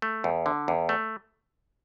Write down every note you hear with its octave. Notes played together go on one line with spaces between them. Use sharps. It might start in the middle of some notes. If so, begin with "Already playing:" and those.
A3
E2
D3
E2
A3